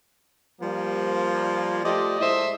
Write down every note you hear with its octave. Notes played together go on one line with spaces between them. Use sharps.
F3 G3 A#3
F3 A3 G4 D5 D#5
A2 G#3 A3 C5 D#5 E5